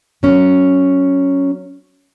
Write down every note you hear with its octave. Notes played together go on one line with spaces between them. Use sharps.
F#3 C#4